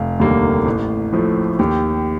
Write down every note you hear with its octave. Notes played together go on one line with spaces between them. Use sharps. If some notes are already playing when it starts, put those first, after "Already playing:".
Already playing: F1 F5
D#2 D3 G3 A#3
A1
A2 F3 A3
D#2 G4